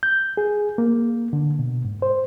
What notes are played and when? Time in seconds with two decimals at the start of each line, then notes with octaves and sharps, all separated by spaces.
0.03 G6
0.37 G#4
0.78 A#3
1.33 D3
1.59 B2
1.85 G#2
2.02 C5